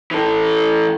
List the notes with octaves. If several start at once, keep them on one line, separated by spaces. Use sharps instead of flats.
E3 A4